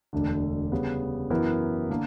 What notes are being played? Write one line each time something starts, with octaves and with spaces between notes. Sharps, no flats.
E1 D2 D3
C#3 G3 B3
F#2 E3 B3 E4 A#4
D3 A#3